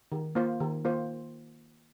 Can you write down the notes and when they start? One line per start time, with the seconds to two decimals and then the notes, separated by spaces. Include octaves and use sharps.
0.12 D#3
0.35 A#3 F4 C5
0.60 D#3
0.85 A#3 F4 C5